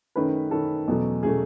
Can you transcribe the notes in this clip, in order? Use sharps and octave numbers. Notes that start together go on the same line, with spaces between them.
F#2 D#3 A3 C#4 B4
F#2 D#3 A3 C#4 A4
E2 B2 F#3 A3 C#4
B2 F#3 A3 C#4 G#4